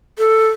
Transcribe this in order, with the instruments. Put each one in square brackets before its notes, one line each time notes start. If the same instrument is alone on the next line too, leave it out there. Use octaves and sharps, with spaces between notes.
[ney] A4